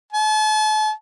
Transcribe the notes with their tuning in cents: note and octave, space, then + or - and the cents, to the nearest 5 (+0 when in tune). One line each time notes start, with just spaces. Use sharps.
A5 -40